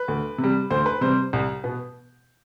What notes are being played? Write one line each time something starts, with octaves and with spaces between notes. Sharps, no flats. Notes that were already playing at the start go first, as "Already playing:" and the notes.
Already playing: B4
D2
C3
G3
D2 C5
B4
C3 G3 C5
C2
B2 B3